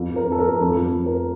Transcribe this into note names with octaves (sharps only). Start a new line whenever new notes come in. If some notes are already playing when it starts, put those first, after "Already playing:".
Already playing: F2
F2
A#4
F2 A4
A#4
F2
F2 A4
F2
F2
A#4